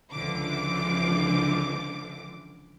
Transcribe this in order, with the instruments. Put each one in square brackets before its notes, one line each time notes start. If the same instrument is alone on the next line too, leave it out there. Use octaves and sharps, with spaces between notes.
[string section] C#2 D3 E3 F3 D6